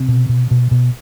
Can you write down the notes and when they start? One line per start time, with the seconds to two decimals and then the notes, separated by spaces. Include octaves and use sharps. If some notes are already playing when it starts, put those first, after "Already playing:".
Already playing: C3 C4
0.08 B2
0.29 B2
0.51 B2
0.71 B2